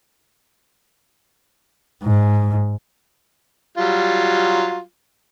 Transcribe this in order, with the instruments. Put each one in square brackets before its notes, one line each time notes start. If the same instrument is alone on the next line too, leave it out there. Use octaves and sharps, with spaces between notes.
[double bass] G#2
[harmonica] F#3 G3 F4